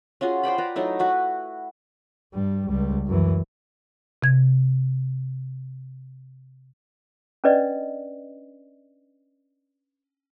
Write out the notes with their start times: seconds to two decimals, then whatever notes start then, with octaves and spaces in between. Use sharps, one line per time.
0.21 C#4 F4 F#4 G#4
0.43 C5 D5 G5 B5
0.58 B4 D5 A#5
0.76 F#3 A3 D#4 E4
0.99 E4 F#4 B4
2.33 G2 G3
2.68 C#2 G3
3.07 F#2 E3
4.22 C3 G#6
7.44 C#4 D4 B4 D5 D#5